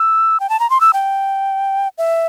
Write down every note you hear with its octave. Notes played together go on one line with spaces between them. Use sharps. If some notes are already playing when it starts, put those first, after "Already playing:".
Already playing: E6
G5
A5
A#5
C6
E6
G5
E5